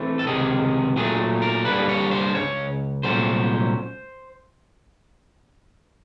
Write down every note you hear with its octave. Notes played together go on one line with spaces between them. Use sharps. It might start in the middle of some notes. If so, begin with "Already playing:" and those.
Already playing: E3 A3 C4
A4
C#2 C3 D#3 G#4
A#2 F#3 A3 G#4
A#4
G2 D3 G3 A#3 D4 B4
C#5
C5
C#2 C#3 C#5
C2 A#2 F#3 A3 C#4 C5